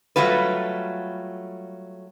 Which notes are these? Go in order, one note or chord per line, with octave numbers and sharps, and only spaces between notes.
F#3 G3 A3 F4 B4